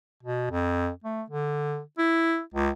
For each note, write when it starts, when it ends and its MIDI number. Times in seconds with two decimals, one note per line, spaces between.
0.23 0.48 47
0.51 0.90 41
1.04 1.22 57
1.30 1.81 50
1.98 2.41 64
2.54 2.70 37